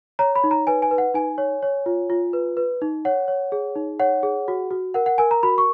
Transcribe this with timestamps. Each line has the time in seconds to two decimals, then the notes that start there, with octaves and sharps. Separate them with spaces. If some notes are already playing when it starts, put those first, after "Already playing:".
0.19 C#5 A#5
0.35 B5
0.44 D#4
0.51 A#5
0.67 B4 G#5
0.82 G#5
0.91 B4
0.98 F#5
1.14 D#4 G#5
1.38 C#5
1.63 C#5
1.86 F4
2.10 F4
2.33 B4
2.57 B4
2.82 D#4
3.05 C#5 F#5
3.28 C#5
3.52 G#4
3.76 D#4
4.00 C#5 F#5
4.23 G#4
4.48 F#4
4.71 F#4
4.94 A#4 F#5
5.06 F#5
5.18 A#4 G#5
5.31 A#5
5.43 F#4 B5
5.58 C#6